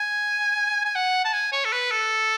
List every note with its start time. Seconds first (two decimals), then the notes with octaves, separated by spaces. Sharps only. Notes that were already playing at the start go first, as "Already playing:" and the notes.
Already playing: G#5
0.85 G#5
0.96 F#5
1.25 A5
1.33 G#5
1.53 C#5
1.65 A4
1.72 B4
1.91 A4